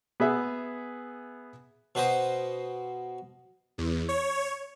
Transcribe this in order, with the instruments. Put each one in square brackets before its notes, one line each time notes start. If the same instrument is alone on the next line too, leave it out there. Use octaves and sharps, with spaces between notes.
[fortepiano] B3 G#4 E5 F#5
[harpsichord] B2 B4 C5 D#5
[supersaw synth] E2
C#5